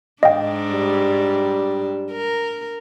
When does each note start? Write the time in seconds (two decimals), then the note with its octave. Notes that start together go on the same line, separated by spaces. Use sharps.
0.23 G#2 D4 D#5 F5 G5
0.71 G3
2.12 A#4